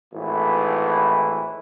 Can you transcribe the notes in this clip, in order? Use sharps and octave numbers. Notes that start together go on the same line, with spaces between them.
G#1 A2 E3